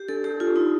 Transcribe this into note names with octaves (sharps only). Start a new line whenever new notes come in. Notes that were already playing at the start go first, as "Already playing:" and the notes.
Already playing: G4
D4 A4
G4 A4
D4 F4
D#4 A4